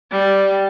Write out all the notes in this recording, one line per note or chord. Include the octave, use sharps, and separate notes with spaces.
G3